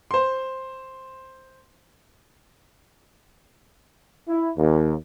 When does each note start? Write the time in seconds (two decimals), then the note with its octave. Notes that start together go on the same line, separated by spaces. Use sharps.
0.11 C5 C6
4.29 E4
4.58 D#2